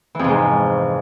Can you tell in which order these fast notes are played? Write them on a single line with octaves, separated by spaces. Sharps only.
E3 F2 C3 G#2